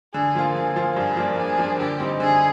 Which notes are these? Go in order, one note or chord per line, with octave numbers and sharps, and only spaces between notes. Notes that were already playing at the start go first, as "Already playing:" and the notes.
D3 G#4
F3 A#3 F4
D3 G#4
F3 A#3 F4
G2 G#4
F3 A#3 D4
G2 G#4
F3 A#3 D4
D3 G4
G3 C4 D#4
D3 G#4